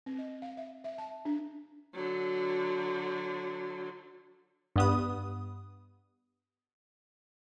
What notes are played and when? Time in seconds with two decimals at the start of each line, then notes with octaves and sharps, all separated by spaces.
0.06 C4
0.19 D#5
0.42 F5
0.57 E5
0.84 E5
0.98 A5
1.25 D4
1.94 D3 F#3
4.76 G2 B3 D#6